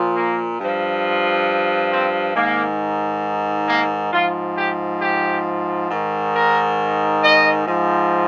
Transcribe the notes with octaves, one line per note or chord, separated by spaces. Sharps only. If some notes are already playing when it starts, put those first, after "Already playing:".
Already playing: A#2 F3
A#3
G2 F3
C4
G#2 D#3 A#3
A#3
G#2 F3 F4
G4
G4
G#2 D#3
A#4
D#5
G#2 F3